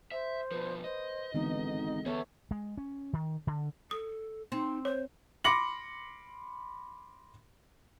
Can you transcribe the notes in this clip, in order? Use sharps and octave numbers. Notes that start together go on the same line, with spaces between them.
C5 E5
B2 F3 B4
C5 D#5
G#1 D3 E3 B3 D#4
B3 G#4 A4 C#5 E5
G#3
C#4
D#3
D3
A4 D#6
C4 D#4
C5 C#5
B5 C6 D6 A#6 C#7 F#7